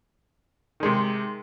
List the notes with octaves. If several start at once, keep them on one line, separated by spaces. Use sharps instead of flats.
C3 D#3 G#3